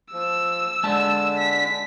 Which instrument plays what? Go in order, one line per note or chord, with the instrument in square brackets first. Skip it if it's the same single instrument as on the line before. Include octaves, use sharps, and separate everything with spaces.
[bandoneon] F3 [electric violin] E6
[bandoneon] D3 [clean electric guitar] G#3 A5
[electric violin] B6